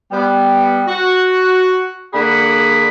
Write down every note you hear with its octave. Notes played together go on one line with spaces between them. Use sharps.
G3 B3
F#4
D3 A#3 D4 G#4 F#5 B5